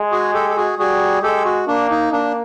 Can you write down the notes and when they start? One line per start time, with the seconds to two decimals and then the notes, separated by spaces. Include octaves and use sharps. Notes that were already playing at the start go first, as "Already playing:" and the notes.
Already playing: G#3
0.11 F#4 G#4
0.33 G4 A4
0.50 A4
0.57 F#4 G#4
0.79 G3 F#4 G#4
1.22 G#3 G4 A4
1.45 F#4
1.67 A#3 D4
1.90 D#4
2.12 A#3 D4